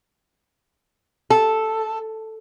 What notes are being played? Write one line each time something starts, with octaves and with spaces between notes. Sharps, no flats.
A4